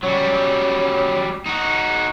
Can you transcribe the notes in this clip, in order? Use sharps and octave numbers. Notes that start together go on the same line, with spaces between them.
F#3 G3 C#4
D#4 F#4